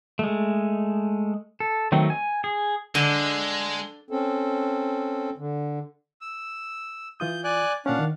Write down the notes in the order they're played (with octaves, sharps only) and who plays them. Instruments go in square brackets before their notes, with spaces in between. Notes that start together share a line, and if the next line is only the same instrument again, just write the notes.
[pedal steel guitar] G#3 A3
A4
D#3 F#3 A3 C4 D#4
G#5
G#4
[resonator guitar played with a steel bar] D3 [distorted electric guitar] G#3
[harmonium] C4 C#4 A4
D3
[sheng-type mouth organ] E6
[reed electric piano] E3 F4 D#6 [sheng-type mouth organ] G6
[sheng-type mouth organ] D5 G#5 F#6
[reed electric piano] A#2 C#4 [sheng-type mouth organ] D4 F5 F#5
[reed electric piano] D#3